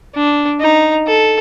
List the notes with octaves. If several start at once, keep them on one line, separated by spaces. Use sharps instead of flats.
D4
D#4
A4